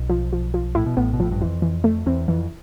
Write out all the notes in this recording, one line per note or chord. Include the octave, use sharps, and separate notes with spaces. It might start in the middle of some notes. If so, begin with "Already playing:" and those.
Already playing: B1 B2
F3
F3
F3
A2 E4
B2
A1 A2 B3
B2
A2 F3
G2
F2 E3
E3
A3
E2 C4
F2 E3